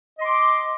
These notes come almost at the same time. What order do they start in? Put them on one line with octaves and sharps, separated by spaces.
D#5 C6 D6